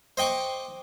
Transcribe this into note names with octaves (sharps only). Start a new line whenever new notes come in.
C5 D#5 G5 C#6 D6